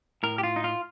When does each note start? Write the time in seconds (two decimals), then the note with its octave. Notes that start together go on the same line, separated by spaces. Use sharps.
0.23 A2 A#4
0.38 G4
0.43 F4
0.56 D#4
0.64 F4